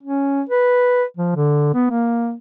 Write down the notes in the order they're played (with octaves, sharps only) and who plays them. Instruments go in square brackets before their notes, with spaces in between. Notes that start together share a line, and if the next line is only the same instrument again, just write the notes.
[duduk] C#4
B4
F3
D3
B3
A#3